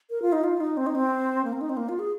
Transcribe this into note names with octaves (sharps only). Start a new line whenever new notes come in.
A#4
F4
D#4
F4
D#4
C4
D#4
C4
A#3
C4
D#4
C4
A#3
F4
G#4